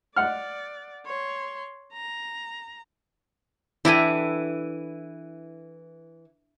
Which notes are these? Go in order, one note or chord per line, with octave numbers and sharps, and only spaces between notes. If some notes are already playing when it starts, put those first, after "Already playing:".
D5 F#5 F6
C#5 C6
A#5
E3 D4 E4 G4 A4 E5 D7 D#7